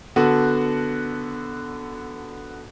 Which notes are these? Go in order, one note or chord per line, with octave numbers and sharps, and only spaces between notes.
D3 B3 F#4 A4